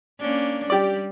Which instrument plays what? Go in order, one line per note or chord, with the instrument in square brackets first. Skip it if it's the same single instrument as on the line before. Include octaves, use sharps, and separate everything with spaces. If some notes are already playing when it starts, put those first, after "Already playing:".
[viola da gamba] A#3 C#4 D4
[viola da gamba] G3 [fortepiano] G4 D5